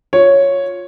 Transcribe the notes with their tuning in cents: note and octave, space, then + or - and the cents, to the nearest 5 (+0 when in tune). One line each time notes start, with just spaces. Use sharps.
F4 +15 C#5 +0